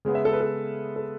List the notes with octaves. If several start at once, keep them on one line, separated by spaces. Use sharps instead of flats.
C#3 G#3 B3
E5
A4
B4
A4
A4